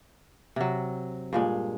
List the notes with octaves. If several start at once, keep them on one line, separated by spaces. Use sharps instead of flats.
C3 F#3
G2 A#2 G#3